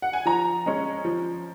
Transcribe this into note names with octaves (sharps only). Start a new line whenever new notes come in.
F#5
G#5
F3 A#5
G#3 C#4
F3